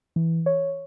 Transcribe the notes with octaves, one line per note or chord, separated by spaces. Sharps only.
E3
C#5